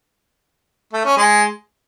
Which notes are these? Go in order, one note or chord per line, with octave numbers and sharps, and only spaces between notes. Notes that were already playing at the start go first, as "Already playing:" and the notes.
A3
C#4
G#3